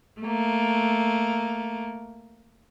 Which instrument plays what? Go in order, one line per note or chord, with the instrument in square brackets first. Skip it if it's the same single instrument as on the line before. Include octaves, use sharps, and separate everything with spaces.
[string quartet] A3 A#3